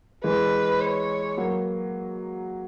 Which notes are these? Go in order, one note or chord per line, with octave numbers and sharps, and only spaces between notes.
E3 G#3 B4
C#5
F#3 A#3